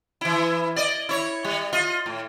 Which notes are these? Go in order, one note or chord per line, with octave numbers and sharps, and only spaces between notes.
E3 E4
D5 D#5
E4 C#5
G3
F4 D#5
A2